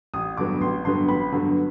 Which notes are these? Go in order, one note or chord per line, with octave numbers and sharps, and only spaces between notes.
A1 D#6
G2 D3 F#3 B3 D6
A1 C6
G2 D3 F#3 B3 C6
A1 B5
G2 D3 F#3 B3